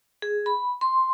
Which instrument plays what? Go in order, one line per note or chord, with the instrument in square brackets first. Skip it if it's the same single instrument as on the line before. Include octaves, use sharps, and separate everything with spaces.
[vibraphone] G#4
B5
C6